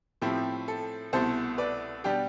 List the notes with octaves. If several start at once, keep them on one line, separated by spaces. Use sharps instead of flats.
A2 F3 C4 E4 G4
A4
C2 B2 A3 E4 A4 C5
B4 D5
B2 G3 D4 G4